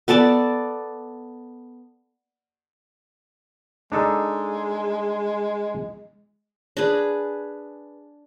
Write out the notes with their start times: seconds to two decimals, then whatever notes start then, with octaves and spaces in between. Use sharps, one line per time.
0.08 B3 A4 D5 A5
3.92 G#3 D4 D#4 A4
6.77 D4 G#4 B4